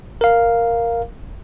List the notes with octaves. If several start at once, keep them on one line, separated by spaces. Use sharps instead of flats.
A#4 F5